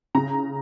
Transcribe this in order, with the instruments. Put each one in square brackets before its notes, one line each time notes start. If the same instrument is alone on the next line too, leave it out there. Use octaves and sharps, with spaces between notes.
[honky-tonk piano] C#3 A#5